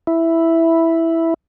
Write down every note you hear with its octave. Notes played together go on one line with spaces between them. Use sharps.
E4